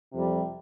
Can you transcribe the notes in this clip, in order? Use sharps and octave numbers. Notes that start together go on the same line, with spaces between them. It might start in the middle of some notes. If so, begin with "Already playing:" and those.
F2 C3 G3